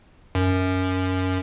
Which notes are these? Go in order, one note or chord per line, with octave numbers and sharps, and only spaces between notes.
F#2